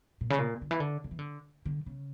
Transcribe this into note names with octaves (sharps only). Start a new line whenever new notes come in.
A#2
C#3
A#2
D3
E3
D3
D3
E3
D3
D3
C#3